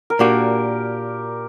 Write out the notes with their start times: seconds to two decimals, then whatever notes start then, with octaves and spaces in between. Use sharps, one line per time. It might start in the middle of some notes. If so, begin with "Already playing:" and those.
0.10 A#4
0.19 A#2 A#3 D4 F#4 G4